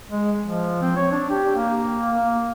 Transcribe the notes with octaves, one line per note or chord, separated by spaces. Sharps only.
G#3
F3
C4
C#5
D4
G4
A#3
A#3